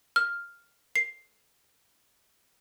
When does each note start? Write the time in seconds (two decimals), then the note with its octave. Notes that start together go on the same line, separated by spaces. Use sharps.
0.16 F6
0.96 C7